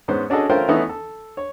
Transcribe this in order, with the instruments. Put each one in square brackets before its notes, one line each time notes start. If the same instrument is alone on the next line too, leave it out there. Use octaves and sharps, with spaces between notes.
[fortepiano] G#2 B3 C#4 C5
C#4 D4 F#4 G#4 A4 D#5
A3 C#4 F4 A#4 C5 G5
E3 A3 B3 C#4 D#4 E4
A4
C#5